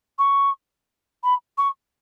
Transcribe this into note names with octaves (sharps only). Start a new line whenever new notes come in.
C#6
B5
C#6